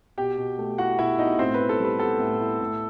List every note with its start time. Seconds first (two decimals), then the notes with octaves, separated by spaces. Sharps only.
0.18 B2 G4 G5
0.38 B2
0.58 A3
0.78 E4 F#4 F#5
0.99 B2 E4 E5
1.19 B2 D#4 D#5
1.39 A2 C4 C5
1.54 B4
1.60 E4
1.69 A4
1.79 G3
1.85 B4
1.99 B3 A4
2.20 A2
2.40 E4
2.60 A2